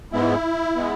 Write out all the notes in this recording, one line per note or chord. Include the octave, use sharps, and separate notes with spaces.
G#2 G#3 B3 E4
G#3 B3